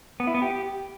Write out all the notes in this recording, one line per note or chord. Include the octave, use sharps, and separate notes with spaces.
B3
E4
B3
G4